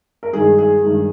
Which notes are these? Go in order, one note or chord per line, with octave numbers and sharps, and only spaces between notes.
A#4
G2 D#3 G#3 G#4
G#4
G2 D#3 G#3